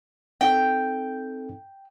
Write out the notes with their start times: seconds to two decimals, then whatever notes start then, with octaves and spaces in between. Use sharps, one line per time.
0.41 C4 D#4 A4 G5